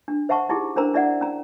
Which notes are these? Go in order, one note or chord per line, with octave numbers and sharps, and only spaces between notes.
D4
C5 E5 F#5 A5 C#6
D#4 E4 G4 G#4
C#4 D4 A#4 C5 A#5
D4 E4 D5 E5 F#5
C#4 A#5